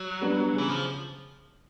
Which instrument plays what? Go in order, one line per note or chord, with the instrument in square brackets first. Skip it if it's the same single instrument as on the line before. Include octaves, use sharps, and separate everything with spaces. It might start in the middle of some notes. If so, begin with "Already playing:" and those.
Already playing: [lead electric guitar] F#3
[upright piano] G3 B3 D4
[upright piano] C#3 [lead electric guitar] E3
[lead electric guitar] F3